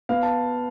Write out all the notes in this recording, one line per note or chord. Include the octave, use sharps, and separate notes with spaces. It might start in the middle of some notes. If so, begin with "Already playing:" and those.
B3 F5
A5